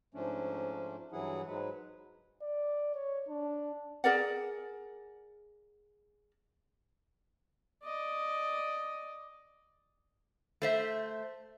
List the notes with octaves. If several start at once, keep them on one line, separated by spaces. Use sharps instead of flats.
G#2 F3 A3 C#4 D4
G2 E3 F#3 E4 G#4 F#5
G#2 F#3 G#3 B4
D5
C#5
D4
G#4 A#4 D5 F#5
D5 D#5
A3 C5 E5